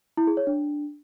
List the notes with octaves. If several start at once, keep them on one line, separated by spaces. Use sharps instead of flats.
E4
G#4
C#5
D4